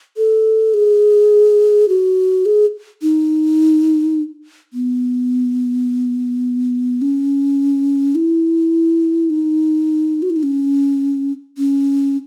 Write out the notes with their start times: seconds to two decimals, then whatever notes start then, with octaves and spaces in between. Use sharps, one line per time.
0.17 A4
0.74 G#4
1.88 F#4
2.45 G#4
3.02 D#4
4.73 B3
7.02 C#4
8.15 E4
9.30 D#4
10.22 F#4
10.30 E4
10.36 D#4
10.43 C#4
11.58 C#4